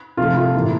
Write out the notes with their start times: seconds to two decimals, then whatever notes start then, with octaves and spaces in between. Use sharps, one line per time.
0.17 C3 F3 A3 F4
0.37 F4
0.54 A2 E3 A#3